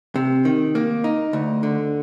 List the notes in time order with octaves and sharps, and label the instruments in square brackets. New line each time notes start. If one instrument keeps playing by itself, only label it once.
[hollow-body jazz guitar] C3
D#3
A#3
D#4
D2
D3